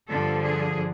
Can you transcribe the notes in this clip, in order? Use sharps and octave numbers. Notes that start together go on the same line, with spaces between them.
G2 D3 F3 A4
G#4